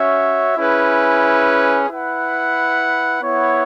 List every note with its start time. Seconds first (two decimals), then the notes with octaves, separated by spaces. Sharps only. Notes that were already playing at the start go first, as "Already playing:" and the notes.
Already playing: C#4 F#4 C#5 E5
0.57 C#4 E4 G#4 B4
1.89 E4 B4 F#5
3.20 B3 E4 C#5 F#5